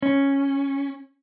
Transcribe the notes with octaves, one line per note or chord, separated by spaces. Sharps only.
C#4